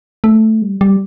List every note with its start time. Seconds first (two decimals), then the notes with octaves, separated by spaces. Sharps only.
0.24 A3
0.62 G3
0.81 G3